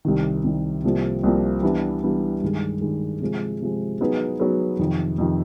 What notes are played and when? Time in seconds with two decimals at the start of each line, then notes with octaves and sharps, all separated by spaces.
0.05 C2 C3 D#3
0.44 C2 C3 D#3
0.84 C2 C3 F3 A#3
1.23 C2 C3 F3 A#3
1.63 E3 G3 B3 D4
2.03 E3 G3 B3 D4
2.42 G2 D#3 G#3
2.81 G2 D#3 G#3
3.21 C3 F3 G#3
3.61 C3 F3 G#3
4.01 F#3 B3 D#4 G#4 B4
4.40 F#3 B3 D#4 G#4 B4
4.79 F2 C3 D#3
5.18 F2 C3 D#3